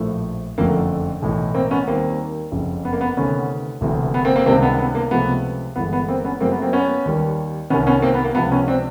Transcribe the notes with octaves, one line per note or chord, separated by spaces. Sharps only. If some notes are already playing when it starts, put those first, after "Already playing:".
Already playing: A#1 A2 F3 A3
F#1 F2 D3 F3 A3 A#3
B1 A2 E3
A#3 C4
B3 C#4
D#2 D#3 G3 A#3 C4
F#1 F2 C#3
B3
A#3
B3
D2 C3 D#3 B3 C#4
E1 D2 C3 E3
B3
A#3 C4
A#3 C4
C#2 C3 D#3 G3 A#3 C4
B3
B3
A#3
C#2 C3 F3 A3 B3
G1 G2 E3 G#3 B3
B3
A#3 C4
B3 C#4
F#2 C#3 F#3 A3 A#3 C4
B3
A#3 C4
B3 C#4
D#2 D#3 G3
C2 C3 D#3 B3 C#4
B3 C#4
A#3 C4
B3
A#3
C#2 C3 F3 G#3 B3
B3 C#4
C4 D4